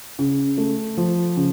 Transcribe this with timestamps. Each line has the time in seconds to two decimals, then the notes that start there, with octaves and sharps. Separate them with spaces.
0.19 C#3
0.58 A3
0.97 F3
1.37 C#3